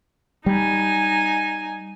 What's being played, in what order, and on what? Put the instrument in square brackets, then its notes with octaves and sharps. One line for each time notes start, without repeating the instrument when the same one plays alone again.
[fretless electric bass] G3 [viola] D#4 G#5